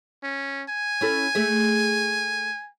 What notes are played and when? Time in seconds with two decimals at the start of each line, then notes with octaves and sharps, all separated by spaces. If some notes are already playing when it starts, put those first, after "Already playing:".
0.23 C#4
0.69 G#5
1.01 C#4 E4 A4
1.35 A3 G#4 E5